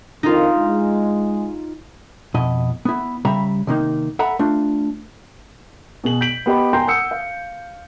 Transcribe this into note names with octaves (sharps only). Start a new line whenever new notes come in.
F2 D#3 D#4 F4
G#3
F2 B2 E4 D#5
B3 E4
C#3 G3 E5 A#5 B5
C3 D#3 A#3 D#4
A4 E5 F#5 A#5 B5
A3 D4 F4
B2 G#4 F#7
G6 B6 D7 F#7
B3 G4 D#5 B5
G5 G#5 A#5 C6 G6
F#5 D#6 E6 C#7
F5